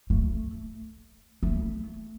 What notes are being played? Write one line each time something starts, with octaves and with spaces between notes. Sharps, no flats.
A3
A3